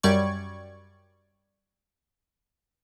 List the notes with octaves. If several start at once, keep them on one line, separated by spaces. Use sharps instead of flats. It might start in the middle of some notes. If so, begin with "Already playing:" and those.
F#2 G3 D5 C#6 G#6